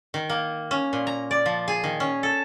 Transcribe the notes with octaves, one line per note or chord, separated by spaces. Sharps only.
D#3
A#3
C#4
A#2
A#5
D5
F3
G#4
D#3
C#4
A4